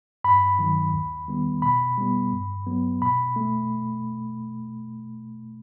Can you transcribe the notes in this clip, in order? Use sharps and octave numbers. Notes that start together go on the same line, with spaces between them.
G2 B5
D#3 F#3
D#2
D#3 G3 B3
B2 B5
G3 B3
G2
F#3 B3
B2 B5
A3